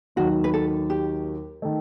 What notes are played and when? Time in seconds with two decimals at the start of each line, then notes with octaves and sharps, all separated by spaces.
0.16 D#2 D#3 F#3 F#4
0.44 B4
0.53 A4
0.90 G4
1.62 D#3 A3